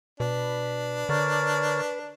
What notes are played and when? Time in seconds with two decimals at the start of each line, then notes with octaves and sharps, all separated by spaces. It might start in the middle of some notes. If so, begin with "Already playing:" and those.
0.20 B2 D4 B4
1.09 D3 A#4 C#5 D5